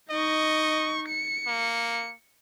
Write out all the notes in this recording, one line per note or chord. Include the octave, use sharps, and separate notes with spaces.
D#4 D#5 C#6
C#7
A#3